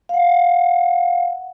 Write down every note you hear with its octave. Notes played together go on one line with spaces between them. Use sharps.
F5 F#5